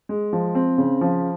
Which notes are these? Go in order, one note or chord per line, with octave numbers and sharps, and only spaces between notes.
G#3
F3
C4
C#3
F3